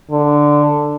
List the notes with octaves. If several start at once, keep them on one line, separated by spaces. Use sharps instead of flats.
D3